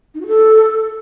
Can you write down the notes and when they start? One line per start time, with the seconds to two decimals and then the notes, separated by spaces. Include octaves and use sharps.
0.14 D#4
0.21 F#4
0.27 A4